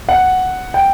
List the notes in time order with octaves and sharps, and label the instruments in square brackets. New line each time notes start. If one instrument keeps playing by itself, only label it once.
[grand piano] F#5
G5